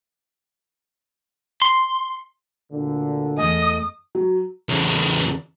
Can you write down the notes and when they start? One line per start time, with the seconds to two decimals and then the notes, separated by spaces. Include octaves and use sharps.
1.62 C6
2.71 D2 A#2 D3
3.37 E2 A3 D#5 G#5 D#6
4.15 F#3
4.69 E2 C#3